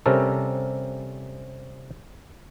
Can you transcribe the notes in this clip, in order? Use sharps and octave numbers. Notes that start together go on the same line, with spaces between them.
C3 G3 C4 C#4 A4 A#4